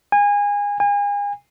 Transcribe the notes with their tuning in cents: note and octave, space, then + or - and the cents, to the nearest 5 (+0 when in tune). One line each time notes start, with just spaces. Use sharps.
G#5 -25
G#5 -35